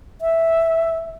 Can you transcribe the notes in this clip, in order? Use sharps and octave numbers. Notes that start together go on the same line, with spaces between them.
E5